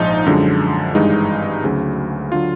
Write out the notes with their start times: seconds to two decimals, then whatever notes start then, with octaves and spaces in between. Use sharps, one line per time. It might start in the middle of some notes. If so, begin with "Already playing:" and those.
Already playing: A#1 G#2 F3 G#3 D#4
0.26 F#2 D3 F3 G#3
0.95 G#1 G2 E3 G#3 D#4
1.64 D2 C#3 F#3
2.32 D3 F#3 F4